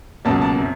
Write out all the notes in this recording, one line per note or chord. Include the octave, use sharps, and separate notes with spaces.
C#2 B2 F#3 A#3 A5
A5
C3